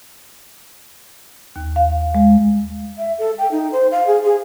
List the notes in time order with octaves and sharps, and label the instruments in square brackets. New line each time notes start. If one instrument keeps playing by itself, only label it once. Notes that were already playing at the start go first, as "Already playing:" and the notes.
[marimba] D#2
F5
G#3
[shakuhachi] E5
A4
G5
D#4
C5
F5
G#4
G#4